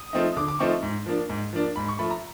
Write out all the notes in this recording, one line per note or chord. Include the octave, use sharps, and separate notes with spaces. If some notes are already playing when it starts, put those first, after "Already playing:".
Already playing: D#6
F3 A3 C4 D#4
D3 D6
D6
F3 A3 C4 D#4 C#6
G#2
F3 A#3 D4
G#2
F3 A#3 D4
G#2 B5
C#6
F3 A3 B5
A#5